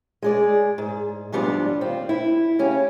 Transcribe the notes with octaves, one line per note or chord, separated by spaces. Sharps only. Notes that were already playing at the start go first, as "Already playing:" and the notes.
G#3 G#4 D5
G#2
D2 G#2 F3 G3 B3 D4
D#2 C4 F4
E4
C#3 C#4 G4